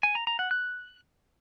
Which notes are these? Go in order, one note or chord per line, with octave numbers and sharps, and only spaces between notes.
G#5
A#5
A#5
F#5
F#6